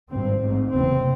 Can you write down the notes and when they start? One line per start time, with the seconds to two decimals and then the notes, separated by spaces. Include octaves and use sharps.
0.10 G#1 G2 C4
0.41 A1 G#2
0.73 F#1 E2 C3 C4